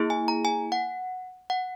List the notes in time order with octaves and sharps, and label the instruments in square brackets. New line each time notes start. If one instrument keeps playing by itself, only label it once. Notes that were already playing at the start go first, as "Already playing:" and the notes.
Already playing: [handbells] A#3 E4 G#4
G#5
A#5
G#5
F#5
F#5